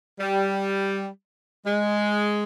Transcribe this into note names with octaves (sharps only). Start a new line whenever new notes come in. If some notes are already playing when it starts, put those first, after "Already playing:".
G3
G#3